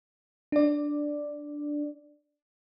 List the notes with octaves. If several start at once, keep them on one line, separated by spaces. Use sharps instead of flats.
D4 D5